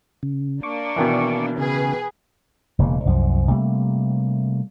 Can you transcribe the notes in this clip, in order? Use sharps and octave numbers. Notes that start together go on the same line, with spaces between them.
C#3
A#3 D4 C#6 D6
B2 D#3 E3
C#3 G#4 B4
E1 C#3 A#3
C2 F#2 F3
C3 G3 A3 A#3